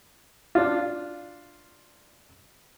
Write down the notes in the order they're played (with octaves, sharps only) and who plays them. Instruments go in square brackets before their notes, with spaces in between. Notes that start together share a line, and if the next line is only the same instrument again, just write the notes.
[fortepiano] D4 F4